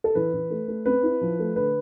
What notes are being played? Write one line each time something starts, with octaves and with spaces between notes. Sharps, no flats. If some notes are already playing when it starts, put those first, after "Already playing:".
A4
E3 B4
E3
A3
A3
C4 B4
E4
F3
A3
D3 B4